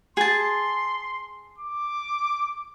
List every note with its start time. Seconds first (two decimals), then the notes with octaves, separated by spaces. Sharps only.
0.17 G#4 A5 C6
1.58 D6